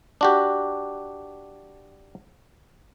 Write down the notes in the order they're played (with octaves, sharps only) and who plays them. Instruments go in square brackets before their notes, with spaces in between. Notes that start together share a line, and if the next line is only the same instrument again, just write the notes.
[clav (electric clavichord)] D4 F#4 G4